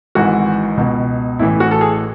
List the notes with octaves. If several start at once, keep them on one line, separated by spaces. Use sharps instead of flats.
G#1 G#2 E3 F#4
C#2 B2
A1 A2 E3 E4
F#4
A4
G#4